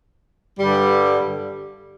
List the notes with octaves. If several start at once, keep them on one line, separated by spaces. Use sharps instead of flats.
G2 D3 G3